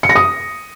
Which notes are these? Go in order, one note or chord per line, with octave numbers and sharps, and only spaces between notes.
C#7
A#6
D#6